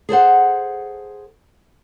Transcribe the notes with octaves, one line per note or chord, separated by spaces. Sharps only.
G#4 A4 C5 F#5